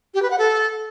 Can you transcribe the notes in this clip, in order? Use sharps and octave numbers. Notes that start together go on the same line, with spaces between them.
G4
B4
F#5
A4